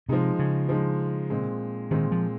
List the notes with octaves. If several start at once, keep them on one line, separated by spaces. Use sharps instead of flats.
C3 F3 G#3 D#4
C#3
F3 G#3 D#4
A#2 G#3 C4
A#2 D#3 G#3 C4
F3